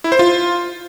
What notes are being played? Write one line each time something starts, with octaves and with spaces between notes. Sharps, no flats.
E4
C5
F4